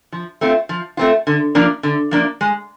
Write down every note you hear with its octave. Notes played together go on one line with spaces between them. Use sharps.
F3
A3 C4 F4
F3
A3 C4 F4
D3
F3 A#3 D4
D3
F3 A#3 D4
G#3